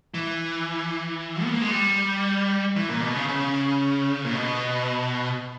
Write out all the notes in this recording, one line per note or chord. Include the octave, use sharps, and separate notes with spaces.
E3
B3
A#3
G#3
G3
E3
A#2
B2
C#3
C#3
A#2
B2